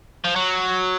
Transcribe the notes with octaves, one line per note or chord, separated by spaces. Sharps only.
F3
F#3